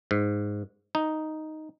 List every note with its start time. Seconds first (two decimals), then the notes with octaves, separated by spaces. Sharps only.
0.11 G#2
0.95 D#4